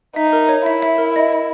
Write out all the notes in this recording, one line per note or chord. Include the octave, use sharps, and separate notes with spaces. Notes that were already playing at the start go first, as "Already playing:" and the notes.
D#4 E5
A#4
C#5
E4 E5
E5
A#4
D#5
D#5